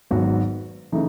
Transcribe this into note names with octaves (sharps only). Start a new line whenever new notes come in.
G#1 G#2 F#3 B3 F#4
C#3 E3 A3 D#4